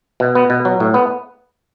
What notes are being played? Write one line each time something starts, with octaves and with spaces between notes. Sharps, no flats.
B2
B3
B2
F#3
A2
B3